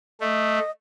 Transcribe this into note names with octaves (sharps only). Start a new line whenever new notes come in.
A3 D#5